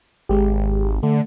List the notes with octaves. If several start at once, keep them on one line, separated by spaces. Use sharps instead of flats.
G#1 G#3 G4
D3 A3